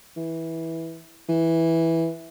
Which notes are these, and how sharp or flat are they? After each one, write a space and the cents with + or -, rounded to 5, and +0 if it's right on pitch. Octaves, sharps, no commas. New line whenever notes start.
E3 -10
E3 -5